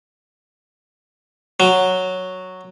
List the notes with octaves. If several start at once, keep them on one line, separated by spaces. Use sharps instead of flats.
F#3